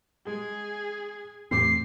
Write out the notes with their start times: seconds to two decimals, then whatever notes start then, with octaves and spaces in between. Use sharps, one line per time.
0.27 G#3 G#4
1.51 E2 A2 A3 C4 C5 D6 C7